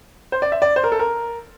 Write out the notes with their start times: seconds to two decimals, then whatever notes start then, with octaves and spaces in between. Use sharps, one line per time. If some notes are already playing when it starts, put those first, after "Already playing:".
0.32 C5
0.42 D5
0.52 E5
0.62 D5
0.76 C5
0.84 A#4
0.92 A4
0.99 A#4